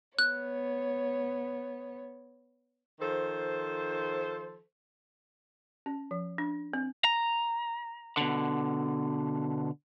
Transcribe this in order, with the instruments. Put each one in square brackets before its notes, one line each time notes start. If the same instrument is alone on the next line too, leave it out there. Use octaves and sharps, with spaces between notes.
[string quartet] B3 C#5 [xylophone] F#6
[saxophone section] D#3 F3 A4 C5
[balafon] C#4
F3
D4
C4
[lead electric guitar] A#5
B2 D3